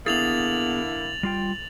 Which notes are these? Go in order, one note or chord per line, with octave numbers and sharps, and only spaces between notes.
D3 A#3 B3 E4 G#4 A6 F7 F#7
G3 F4 G5